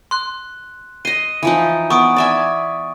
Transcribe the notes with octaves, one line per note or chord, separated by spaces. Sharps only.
C6 F#6
D#5 C6 D#7
E3 F3 D#4
B3 C#6 D#6 D7
D5 E5 G#5